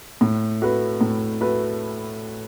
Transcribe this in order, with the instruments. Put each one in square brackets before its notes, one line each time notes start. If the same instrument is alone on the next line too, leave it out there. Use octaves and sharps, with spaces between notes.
[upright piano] A2
A3 F#4 B4
A2
A3 F#4 B4